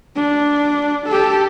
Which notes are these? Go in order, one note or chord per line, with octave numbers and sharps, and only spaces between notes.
D4
G4 A4